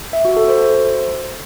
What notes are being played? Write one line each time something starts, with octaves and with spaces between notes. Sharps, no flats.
E5
F#4
A4
C5